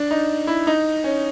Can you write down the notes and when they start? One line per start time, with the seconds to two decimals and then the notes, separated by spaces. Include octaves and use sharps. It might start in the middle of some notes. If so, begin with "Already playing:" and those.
Already playing: D4
0.11 D#4
0.47 E4
0.67 D#4
1.04 C#4